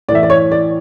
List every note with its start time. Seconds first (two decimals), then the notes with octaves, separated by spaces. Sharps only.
0.08 A2 D5
0.12 E3 E5
0.23 D5
0.30 C#5
0.52 D5